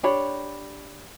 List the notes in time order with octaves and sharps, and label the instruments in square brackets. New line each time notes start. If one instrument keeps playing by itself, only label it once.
[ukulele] D4 G4 C#5 B5